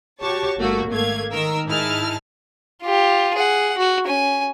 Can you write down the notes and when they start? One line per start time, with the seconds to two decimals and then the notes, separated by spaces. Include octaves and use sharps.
0.22 F#4 G4 C#5 A5 C#6
0.59 G1 A3 A#3 F#4
0.88 G#1 A3 A#3 F5 G#6
1.31 D#3 A#4 E6
1.67 G#2 D#4 E4 G#4 A5 F6
2.82 F4 G4
3.35 G#4 F#5
3.78 F#4
4.06 C#4 G#5